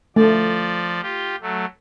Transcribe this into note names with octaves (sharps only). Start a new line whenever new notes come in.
F3 A3 D5
F4 G4
F#3 A3